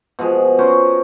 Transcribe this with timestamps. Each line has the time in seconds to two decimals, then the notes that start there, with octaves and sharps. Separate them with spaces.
0.19 B2 F3 G#3 G#4
0.59 C#4 F#4 A#4 C5